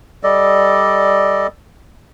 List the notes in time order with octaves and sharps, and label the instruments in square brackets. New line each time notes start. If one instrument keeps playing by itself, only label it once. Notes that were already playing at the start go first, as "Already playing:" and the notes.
[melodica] G3 A4 D5 D#5